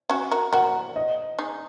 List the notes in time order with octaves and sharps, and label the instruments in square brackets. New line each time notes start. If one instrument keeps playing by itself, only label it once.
[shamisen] C#4 F#4
F#4 A#4
[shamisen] F#4 A#4 [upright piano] F#5
[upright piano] D#5
[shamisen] D#4 G#4